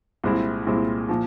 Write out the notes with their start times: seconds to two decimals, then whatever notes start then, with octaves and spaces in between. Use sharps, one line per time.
0.24 C2 A#2 G#3 C4 E4
0.67 C2 A#2 G#3 C4 E4
1.09 A#2 F3